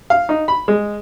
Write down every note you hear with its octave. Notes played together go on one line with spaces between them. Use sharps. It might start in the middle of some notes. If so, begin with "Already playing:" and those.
F5
D#4
B5
G#3